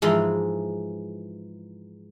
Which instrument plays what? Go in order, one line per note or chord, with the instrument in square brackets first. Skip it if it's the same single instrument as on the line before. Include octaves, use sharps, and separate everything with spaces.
[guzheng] G#2 E3 F3 G#3